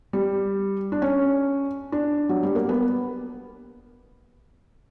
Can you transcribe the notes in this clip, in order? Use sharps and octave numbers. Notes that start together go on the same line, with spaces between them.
G3
D4
C#4
D4
F#3
G3
A#3
B3